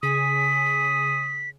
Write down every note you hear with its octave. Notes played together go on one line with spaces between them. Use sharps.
C#3 G#5 D#6 B6